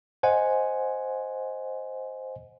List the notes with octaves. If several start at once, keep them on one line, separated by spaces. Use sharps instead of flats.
C5 D#5 F#5 G#5